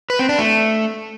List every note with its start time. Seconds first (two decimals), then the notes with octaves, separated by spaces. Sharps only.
0.10 B4
0.19 C4
0.29 D4
0.39 A3